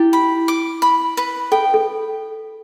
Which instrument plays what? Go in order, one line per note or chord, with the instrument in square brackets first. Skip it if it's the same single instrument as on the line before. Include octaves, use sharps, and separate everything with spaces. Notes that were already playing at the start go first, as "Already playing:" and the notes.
Already playing: [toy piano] E4 [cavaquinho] G4
[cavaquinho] B5
D6
B5
B4
[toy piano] A4 [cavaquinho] G5
[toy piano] A4